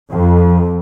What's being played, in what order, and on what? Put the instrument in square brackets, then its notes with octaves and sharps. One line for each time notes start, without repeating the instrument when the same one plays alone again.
[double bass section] F2